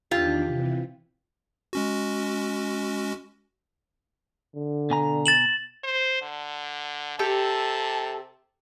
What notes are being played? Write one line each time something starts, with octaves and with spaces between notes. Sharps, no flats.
E2 D#3 D4 F4 G4
C3 E3
G#3 C#4 F#4
D3
B2 G#5 A#5
A6 E7 F#7
C5
D3
C3 G4 A4 A5